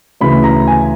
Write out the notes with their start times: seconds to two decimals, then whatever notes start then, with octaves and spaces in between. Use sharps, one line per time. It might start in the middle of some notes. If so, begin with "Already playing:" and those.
0.21 D2 C#3 E3 B5
0.44 A#5
0.67 G#5